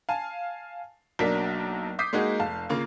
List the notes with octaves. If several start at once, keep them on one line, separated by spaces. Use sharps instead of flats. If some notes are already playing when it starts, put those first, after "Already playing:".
F5 G#5 A5
B1 F#3 A#3 D4 A#4 B6
D6 D#6 G6 B6 C7
G#3 A#3 D#4 F#4 G#4
F1 F5 A5
C#3 A#3 F4